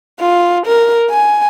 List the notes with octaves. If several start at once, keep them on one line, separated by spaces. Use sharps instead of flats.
F4
A#4
G#5